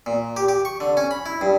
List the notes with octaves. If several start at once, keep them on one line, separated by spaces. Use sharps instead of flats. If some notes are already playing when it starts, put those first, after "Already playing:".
A#2
G4
G4
C#6
D3
C#4
B5
E4
G2